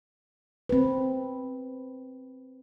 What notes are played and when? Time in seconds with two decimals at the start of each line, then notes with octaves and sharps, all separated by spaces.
0.69 C4 B4